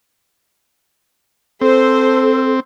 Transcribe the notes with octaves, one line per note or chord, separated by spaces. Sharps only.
C4 A4 C5